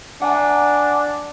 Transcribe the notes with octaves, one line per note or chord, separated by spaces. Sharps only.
D4 F#5 G#5